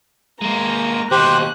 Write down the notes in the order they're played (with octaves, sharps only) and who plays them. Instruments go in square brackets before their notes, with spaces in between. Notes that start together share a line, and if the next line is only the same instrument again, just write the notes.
[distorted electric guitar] G#3 A#3 [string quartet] A#5
[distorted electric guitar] D#2 B2 [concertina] G4 C5 [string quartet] F#6